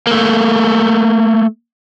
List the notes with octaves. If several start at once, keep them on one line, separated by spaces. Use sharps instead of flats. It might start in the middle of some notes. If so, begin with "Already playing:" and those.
A3 A#3